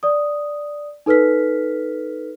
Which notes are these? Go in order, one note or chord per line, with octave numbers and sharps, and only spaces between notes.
D5 D#6
D#4 A4 B4 F6 B6